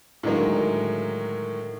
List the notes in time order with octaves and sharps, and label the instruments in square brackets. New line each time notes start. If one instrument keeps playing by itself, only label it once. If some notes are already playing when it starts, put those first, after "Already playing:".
[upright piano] A2 D3 D#3 F#3 G#3 A#3